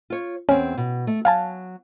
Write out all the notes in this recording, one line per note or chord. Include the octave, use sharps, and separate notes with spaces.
F4 C#5
E2 C4 C#4
B2
A3
F#3 F5 G#5 A5